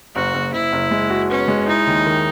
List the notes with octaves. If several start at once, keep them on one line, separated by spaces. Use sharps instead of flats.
F#1 F#4
F#1
F#1 E4
F#1
G#3
F#4
B3 C#4
G#3
D#4 E4
D#2
D#3